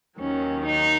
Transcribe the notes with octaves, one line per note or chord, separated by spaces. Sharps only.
D#2 D#3 F#3 C#4
D#4